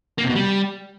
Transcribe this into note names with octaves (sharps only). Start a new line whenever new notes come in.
A#3
C3
B2
G3